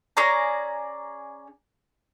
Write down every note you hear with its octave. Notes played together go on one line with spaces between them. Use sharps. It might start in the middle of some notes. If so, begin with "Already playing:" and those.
C#4 G#4 D5 A#5